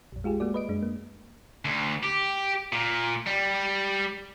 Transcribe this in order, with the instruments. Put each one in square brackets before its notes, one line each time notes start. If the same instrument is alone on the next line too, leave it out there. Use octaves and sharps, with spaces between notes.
[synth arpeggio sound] A#1 F2
G#3 F4 G4 G#4
G#3 A#3 F#4 D5
B4 D#5 D7
F#2 G#3 D4
A#3
[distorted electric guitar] D2
G4
A#2
G3